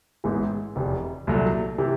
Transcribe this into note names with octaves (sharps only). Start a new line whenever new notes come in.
A1 G#2 E3 G#3 B3
F1 E2 C3
C2 A#2 F#3 A3
C3 E3